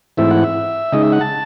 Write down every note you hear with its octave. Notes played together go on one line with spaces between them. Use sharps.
G#2 E3 A3 C4 E4 E5
F#5
E5
C#3 G#3 D#4 D#5
E5
F#5
A5